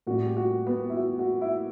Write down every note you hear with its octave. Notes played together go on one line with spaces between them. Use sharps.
A2 G3 F#4
G4
F#4
B3
E4
F#4
F#4
E4